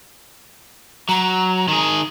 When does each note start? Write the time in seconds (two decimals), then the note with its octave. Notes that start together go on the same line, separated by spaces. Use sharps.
1.09 F#3 A#5
1.68 D#3 G#4